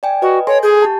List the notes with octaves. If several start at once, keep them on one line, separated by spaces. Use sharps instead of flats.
D5 G5 G#5
F#4 B4 D#5
A4 C#5 G#5 C6
G#4 G6
G4 A5